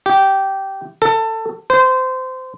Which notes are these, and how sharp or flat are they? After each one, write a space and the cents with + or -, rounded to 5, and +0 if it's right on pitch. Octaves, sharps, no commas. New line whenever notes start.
G4 -15
A4 +20
C5 -20